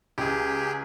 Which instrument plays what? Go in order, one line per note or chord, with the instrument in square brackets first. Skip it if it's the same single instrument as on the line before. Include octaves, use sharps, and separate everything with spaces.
[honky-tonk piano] C#2 [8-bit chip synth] G4 G#4